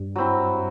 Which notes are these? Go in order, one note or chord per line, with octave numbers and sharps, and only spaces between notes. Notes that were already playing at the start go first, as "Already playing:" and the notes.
Already playing: G2
F#3 C4 E4